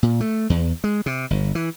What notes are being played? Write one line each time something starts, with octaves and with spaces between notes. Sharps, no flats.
A#2
A3
E2
G#3
C3
G1
E3